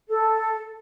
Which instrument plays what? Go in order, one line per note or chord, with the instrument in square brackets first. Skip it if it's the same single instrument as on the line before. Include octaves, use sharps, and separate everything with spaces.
[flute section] A4